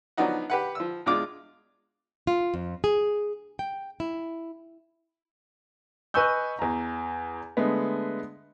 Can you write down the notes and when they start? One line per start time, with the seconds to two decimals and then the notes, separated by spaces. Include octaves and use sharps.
0.17 F3 F#3 B3 D4 D#4 F#4
0.50 G4 B4 F#5
0.75 F3 E6
1.06 E2 G#3 D4 F4 D6
2.27 F4
2.54 F2
2.84 G#4
3.59 G5
4.00 E4
6.14 B4 D#5 G#5 C#6 E6 G6
6.59 E2 A#5
7.57 D3 G#3 A3 B3